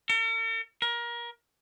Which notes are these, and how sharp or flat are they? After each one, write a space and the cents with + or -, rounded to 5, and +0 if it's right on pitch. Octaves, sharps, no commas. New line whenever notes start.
A#4 -45
A#4 +25